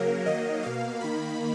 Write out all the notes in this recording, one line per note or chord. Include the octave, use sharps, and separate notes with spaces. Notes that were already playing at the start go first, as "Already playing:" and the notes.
Already playing: C#3 F#3 A#3 A#4
D#3 F#3 A#3 D#5
B2 A#3 F5
D#3 A#3 B5